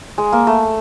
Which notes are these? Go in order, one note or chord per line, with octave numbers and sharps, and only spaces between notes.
G#3
A#3
A3